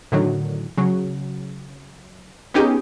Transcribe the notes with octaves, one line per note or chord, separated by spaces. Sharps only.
A2 D3 D#3 F#3
C#3 F#3
B3 C#4 D#4 G4 G#4